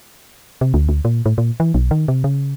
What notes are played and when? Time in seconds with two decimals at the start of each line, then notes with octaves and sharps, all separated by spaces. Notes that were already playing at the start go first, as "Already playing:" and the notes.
0.61 C3
0.74 D2
0.89 D2
1.05 A#2
1.26 A2
1.38 A#2
1.60 E3
1.74 B1
1.91 D#3
2.08 C3
2.24 C#3